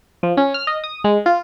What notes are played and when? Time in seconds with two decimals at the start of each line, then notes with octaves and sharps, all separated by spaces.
0.23 F3
0.37 C#4
0.54 F6
0.67 D#5
0.84 D#6
1.04 G#3
1.26 F4